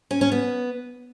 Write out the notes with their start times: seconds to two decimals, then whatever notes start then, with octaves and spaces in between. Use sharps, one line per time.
0.11 C#4
0.21 C#4
0.32 B3